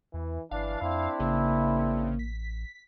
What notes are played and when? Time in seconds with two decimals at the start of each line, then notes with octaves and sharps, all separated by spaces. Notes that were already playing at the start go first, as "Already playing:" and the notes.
0.14 E2 E3
0.51 G1 E3 D4 F5
0.82 F2 C4 D4 E4
1.20 A1 C#3 A#3
2.19 B6